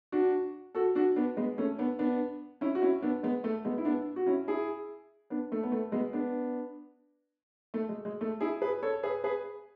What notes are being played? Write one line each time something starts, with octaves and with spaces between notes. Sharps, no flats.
D4 F#4
F#4 A4
D4 F#4
B3 D4
G#3 B3
A3 C#4
B3 D4
B3 D4
C#4 E4
F#4
C#4 E4
B3 D4
G#3 B3
A3
G#3 B3
E4
B3 D4
F#4
C#4 E4
E4 G#4
B3 D4
A3
B3
A3
G#3 B3
B3 D4
A3
G#3
G#3
A3
E4 G#4
G#4 B4
A4 C#5
G#4 B4
G#4 B4